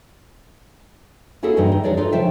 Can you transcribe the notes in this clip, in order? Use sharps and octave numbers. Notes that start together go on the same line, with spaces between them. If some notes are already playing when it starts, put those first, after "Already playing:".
A#3 C#4 E4 F#4 G#4 A4
E2 G2 A#2 D#3 D#4
D#4
E2 D4 G#4 A#4 C#5 D5
D#4 F4 A4 B4
C#3 F3 G#3 C5 E5 G5